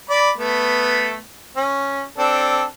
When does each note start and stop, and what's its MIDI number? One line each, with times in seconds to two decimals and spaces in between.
0.10 0.30 74
0.10 0.30 83
0.38 1.18 57
0.38 1.18 59
1.56 2.03 61
2.18 2.64 60
2.18 2.64 62
2.18 2.64 69